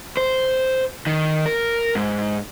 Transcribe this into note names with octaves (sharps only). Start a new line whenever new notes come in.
C5
D#3
A#4
G#2